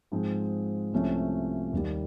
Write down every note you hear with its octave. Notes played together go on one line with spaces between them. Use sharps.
G#2 F3 G#3 C4
C2 C3 F3 A3 C#4
D#2 D#3 G3